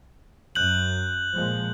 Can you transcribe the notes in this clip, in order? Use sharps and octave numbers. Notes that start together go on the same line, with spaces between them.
F#2 F#6 G6 F#7
A#2 F3 G#3